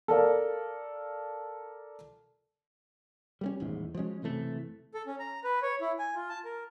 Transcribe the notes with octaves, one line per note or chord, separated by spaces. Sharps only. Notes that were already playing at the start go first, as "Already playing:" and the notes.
A4 A#4 D5 F5
G3 A3 C#4
D#1 A1 E2 G#2
F3 F#3 G#3 C#4
F#1 C3 E3 A3
A4
C#4
A#5
B4
C#5
E4
G#5
F4
A5
A#4